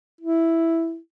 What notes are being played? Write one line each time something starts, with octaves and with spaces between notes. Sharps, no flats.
E4